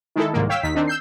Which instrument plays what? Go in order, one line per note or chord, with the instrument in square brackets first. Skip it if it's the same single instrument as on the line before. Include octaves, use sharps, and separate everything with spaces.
[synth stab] D#3 G#3 E4 A4
C2 G#2 D#3 A#3
C#5 F5 G5 E6 B6
D#2 D#3 B6
D#3 C4 D4 D#4
E6 G6 C7